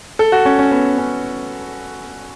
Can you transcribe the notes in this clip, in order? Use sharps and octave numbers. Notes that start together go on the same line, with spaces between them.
A4
F#4
C#4
C#4
B3
C#4